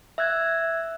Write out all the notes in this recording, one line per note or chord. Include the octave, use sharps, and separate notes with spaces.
E5 E6 F#6 G#6